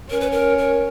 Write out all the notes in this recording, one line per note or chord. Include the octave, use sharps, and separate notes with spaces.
C#4 A#4
B4
A#4
A#4